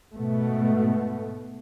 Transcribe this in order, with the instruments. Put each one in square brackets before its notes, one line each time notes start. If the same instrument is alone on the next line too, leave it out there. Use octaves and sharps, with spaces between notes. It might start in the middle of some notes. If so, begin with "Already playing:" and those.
[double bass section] G#2 B2 A3